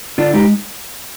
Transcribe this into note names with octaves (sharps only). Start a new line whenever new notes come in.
D3 D4 F4
G#3 D#4 G4